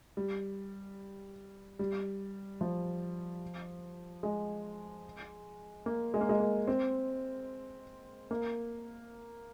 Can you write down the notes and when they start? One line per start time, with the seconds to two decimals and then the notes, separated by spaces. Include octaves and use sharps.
0.17 G3
1.79 G3
2.61 F3
4.23 G#3
5.86 A#3
6.14 G#3
6.21 A#3
6.29 G#3
6.40 A#3
6.68 C4
8.31 A#3